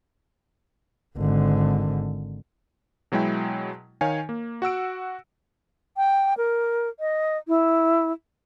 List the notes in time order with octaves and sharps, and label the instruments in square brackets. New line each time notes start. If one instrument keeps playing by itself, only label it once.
[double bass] G#1 D3
[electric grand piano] B2 F#3 G#3 E4 G5
D#3 C#5 F5 G#5
A#3
F#4 F#5 E6 D7
[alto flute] G5
A#4
D#5
E4